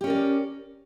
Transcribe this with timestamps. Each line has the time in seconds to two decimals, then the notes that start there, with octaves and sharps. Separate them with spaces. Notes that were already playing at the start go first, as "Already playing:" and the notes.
0.01 G4
0.04 C#4
0.07 A#4
0.10 D5